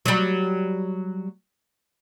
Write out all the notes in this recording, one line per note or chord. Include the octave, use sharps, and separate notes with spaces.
F#3 G3